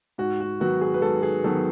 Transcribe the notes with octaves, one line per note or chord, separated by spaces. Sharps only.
G#2 F#4
F#4
D#3 F#3 B3 F#4
G#4
B4
G#2 A4
G#4
D#3 F#3 B3 A4